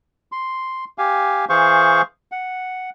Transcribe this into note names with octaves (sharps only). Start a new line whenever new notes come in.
C6
G4 F5 G#5
E3 G#4 C5 F5 C#6
F#5